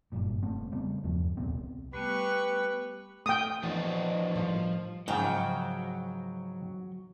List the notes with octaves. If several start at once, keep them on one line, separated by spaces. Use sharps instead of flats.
F#1 G2 A#2
F1 A3 C4
C#3 G3 A3 B3
E2 G2 F3
D#1 C2 B3 C4
G3 A3 B3 G4 B4 C#6 F#6
A3 G5 D#6
E3 F3 B3 D4 F#4 D5 D#5
A2 D#3 F3 G3
G#2 C#3 F3 F#3 G5